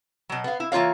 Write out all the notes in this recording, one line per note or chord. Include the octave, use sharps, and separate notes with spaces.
B2 F#3
B3 F5
E4
E3 A#3 F4 C#5 F5